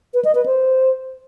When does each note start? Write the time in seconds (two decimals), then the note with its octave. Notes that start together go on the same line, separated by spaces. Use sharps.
0.14 B4
0.25 D#5
0.35 B4
0.46 C5